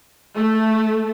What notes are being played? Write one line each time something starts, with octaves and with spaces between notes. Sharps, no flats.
A3